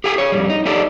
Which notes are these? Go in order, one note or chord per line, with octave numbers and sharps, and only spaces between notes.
G4 A4 G5 G#5
G#4 C#5
F2 G#2 G3
D#4
D#4 G4 A4 D5